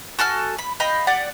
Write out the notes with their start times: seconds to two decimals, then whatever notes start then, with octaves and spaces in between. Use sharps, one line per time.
0.19 F#4 A4 G#5 F6
0.59 B5
0.80 D#5 F5 G5 B5
1.07 G4 D5 F#5